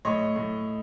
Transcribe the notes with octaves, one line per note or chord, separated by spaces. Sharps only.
A2 C#5 D#5
A2